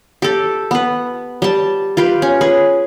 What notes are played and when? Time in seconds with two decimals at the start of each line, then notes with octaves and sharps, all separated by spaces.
0.22 G4 A4
0.71 B3 B4
1.42 G3 A5
1.97 F4 G4 B4
2.22 C#4
2.41 G#4 B4